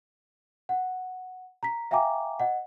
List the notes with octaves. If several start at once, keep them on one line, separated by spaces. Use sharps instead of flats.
F#5
A#5 B6
E5 F5 G5 G#5 A#5 D6
D#5 F#5